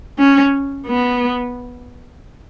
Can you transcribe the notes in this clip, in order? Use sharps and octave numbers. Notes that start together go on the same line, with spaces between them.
C#4
B3